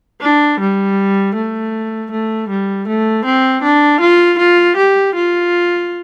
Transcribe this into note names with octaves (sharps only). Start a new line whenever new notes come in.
D4
G3
A3
A3
G3
A3
C4
D4
F4
F4
G4
F4